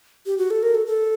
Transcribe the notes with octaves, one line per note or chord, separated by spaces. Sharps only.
G4
F#4
A4
A#4
A4
A4